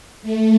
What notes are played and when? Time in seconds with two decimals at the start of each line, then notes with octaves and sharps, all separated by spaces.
0.22 A3